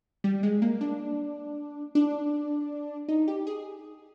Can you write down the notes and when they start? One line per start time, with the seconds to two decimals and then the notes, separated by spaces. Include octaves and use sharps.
0.24 G3
0.43 G#3
0.62 A#3
0.81 D4
1.95 D4
3.08 D#4
3.28 G4
3.47 G#4